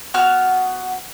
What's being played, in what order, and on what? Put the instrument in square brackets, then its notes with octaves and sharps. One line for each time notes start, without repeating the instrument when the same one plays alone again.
[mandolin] B3 F#4 F6